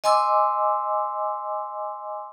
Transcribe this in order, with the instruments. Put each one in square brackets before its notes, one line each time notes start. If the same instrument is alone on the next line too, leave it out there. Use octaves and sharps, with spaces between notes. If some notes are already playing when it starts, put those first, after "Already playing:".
[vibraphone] D#5 G#5 C6 D6 E6